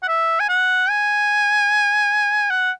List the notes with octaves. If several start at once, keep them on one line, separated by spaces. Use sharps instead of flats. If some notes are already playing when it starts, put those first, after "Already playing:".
F#5
E5
G#5
F#5
G#5
F#5